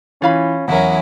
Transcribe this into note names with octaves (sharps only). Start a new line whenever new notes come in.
E3 C#4 F4 F5 B5
E2 F#3 C#4 E4 A#4 F#5